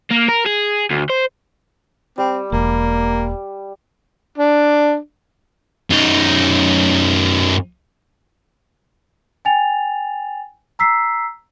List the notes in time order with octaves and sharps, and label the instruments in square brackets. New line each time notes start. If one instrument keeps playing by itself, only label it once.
[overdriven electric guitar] A#3
A#4
G#4
D2
C5
[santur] G3 [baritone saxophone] C4
[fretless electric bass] E1 [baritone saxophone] A#3
[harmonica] D4
[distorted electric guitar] F#2 D#4
[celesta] G5 G#5 A6 F7
A#5 E6 B6 C7